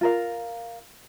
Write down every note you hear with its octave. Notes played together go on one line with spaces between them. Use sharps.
F4 A#4 F5